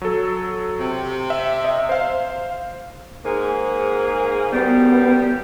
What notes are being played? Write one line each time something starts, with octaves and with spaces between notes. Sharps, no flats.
F#3 A4
C3
E5
D#5 E5
C5 F5
G#2 A#3 G#4
F#2 A2 G3 B3